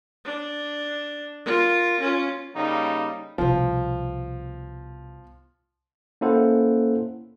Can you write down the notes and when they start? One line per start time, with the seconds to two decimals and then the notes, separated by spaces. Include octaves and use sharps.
0.25 D4
1.46 F4 A#4
2.00 C#4 F4
2.54 C#3 G3 A#3 D#4
3.38 C2 B2 F3
6.21 A#3 C#4 E4 A4 C5 F#5